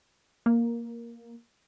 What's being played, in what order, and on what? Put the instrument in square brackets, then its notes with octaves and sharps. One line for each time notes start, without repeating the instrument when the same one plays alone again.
[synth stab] A#3